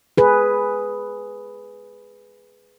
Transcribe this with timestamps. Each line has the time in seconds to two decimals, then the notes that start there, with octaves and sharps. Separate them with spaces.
0.18 G#4 B4